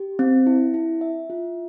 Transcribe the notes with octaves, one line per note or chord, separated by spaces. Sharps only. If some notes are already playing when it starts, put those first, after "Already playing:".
Already playing: G4
C4
E4
E4
E5
F4